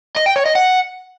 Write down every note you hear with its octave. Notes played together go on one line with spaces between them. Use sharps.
D#5
G5
C#5
D#5
F#5